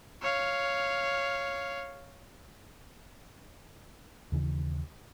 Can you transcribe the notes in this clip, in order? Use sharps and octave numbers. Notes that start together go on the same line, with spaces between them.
C#5 F5
D#2 C#3 E3